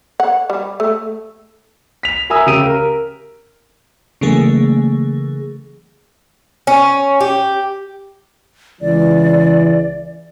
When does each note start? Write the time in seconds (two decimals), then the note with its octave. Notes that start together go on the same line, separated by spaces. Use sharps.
0.20 F#5
0.50 G3
0.80 A3
2.03 B6 F7
2.30 A#4 E5 G#5 A#5 D#6 E6
2.47 C#3 G4 E6 D7 D#7
2.65 A#4
4.21 C#3 E3 F#3 A3 A#3 G#4
6.67 C#4
7.20 G4
8.82 C#2 E3 D5